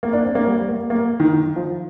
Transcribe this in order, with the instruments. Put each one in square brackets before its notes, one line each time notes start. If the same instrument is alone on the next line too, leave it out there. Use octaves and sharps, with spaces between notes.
[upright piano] A#3
D4
C4
A#3
G3
A#3
A#3
D#3
D#3
F3